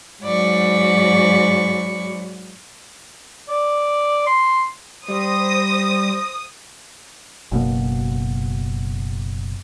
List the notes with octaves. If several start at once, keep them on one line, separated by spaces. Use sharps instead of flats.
G#2 F#3 D5 B5 C#6
D5
C6
G3 C5 D#6 A#6
F#1 B2 A#3